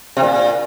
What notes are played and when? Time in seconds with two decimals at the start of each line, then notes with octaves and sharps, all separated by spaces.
0.17 C3
0.23 A#2